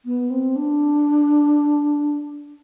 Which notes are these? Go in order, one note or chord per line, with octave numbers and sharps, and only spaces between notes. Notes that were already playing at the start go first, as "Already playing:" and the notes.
B3
C4
D4